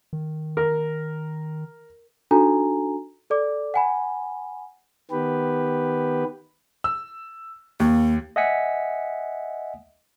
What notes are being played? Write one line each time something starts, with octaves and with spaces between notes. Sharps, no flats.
D#3
A#4
D4 D#4 F#4 A4 G#5 A#5
A4 D5 D6
F#5 G#5 B5
D#3 B3 G4 B4
E6
D#2 A#3
D#5 E5 F#5 G#5 B6 C#7